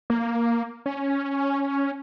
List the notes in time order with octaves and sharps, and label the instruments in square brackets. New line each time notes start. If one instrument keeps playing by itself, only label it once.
[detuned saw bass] A#3
C#4